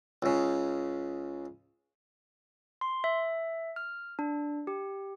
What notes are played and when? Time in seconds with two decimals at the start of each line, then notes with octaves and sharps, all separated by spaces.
0.22 C#2 C#3
2.81 C6
3.04 E5
3.76 F6
4.19 D4
4.67 G4